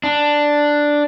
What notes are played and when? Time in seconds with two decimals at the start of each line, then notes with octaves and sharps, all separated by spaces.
0.03 D4